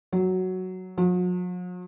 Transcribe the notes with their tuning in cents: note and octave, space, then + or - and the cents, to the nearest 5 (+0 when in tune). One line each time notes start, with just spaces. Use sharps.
F#3 +5
F#3 -45